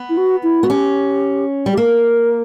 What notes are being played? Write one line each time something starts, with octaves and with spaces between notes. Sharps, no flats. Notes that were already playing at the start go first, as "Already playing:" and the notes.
Already playing: B3
E4
F#4
E4
B3 F#4
C#4 G4
G3
G4
A#3 A#4